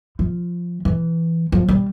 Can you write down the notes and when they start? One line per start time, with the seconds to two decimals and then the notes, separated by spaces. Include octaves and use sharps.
0.19 F3
0.85 E3
1.52 F3
1.69 G3